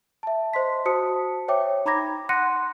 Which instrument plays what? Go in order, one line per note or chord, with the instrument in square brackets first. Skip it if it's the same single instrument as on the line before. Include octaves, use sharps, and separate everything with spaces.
[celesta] E5 A5
C5 D#5 C6 B6
F#4 C5 A5 D#6 C#7
C5 C#5 E5 G5 D6
D#4 A#5 B5 D6 G#6 A#6
F#5 C6 F#6 A#6 C#7 D#7